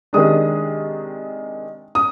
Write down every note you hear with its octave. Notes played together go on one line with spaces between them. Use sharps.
C3 D#3 G#3 D4 D#6
D#6